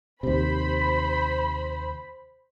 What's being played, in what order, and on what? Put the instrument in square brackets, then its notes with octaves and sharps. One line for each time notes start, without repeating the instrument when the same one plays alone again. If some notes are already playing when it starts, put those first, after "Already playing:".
[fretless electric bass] D#2 C3 [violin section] C5 B5